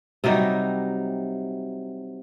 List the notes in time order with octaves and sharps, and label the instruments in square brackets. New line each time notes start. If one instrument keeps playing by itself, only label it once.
[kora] C3 F#3 G3 D#4